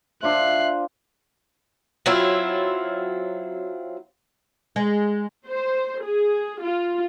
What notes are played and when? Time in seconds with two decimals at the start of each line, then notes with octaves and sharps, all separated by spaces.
0.23 D4 F4 C5 E5 F#6 C7
2.06 F#3 C4 E4 F4
4.76 G#3
5.46 C5
6.03 G#4
6.61 F4